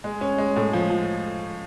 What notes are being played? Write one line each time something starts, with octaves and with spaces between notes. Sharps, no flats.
G#3
C#4
G#3
A2
F3
F3